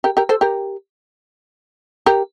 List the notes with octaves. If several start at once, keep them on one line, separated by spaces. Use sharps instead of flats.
G4 A#4
G4 A#4
A4 C5
G4 A#4
G4 A#4